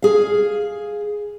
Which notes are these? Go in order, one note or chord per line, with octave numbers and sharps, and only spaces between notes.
G#4 F5